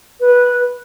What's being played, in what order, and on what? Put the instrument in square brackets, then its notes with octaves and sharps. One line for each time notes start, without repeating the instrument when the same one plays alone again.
[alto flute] B4